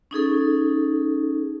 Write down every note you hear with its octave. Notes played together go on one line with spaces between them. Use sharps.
C#4 D#4 G#4 A4